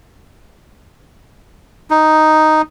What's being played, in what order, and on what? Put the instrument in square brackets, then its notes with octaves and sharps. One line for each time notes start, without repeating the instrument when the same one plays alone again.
[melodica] D#4